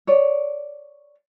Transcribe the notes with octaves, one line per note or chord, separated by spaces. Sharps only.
C#5 D5